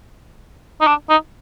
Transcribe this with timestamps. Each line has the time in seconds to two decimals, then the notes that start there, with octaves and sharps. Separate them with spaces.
0.81 D#4
0.87 D4
1.10 D#4